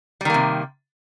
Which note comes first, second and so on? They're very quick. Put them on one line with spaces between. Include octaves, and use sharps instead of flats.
G3 D#3 A#3 C3